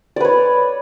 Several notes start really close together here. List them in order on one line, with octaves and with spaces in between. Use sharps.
D5 B4 C#5